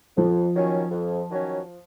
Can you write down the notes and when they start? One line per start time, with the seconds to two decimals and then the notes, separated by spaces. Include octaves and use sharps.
0.17 F2 F3
0.54 D#3 F#3 C#4
0.91 F2
1.29 D#3 F#3 C#4